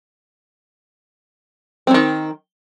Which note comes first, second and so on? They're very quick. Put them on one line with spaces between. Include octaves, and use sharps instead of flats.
C4 F#3 D#3